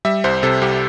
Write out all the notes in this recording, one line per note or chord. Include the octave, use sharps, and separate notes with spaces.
G3 E5
C2 C5
C3 A4
C2 G4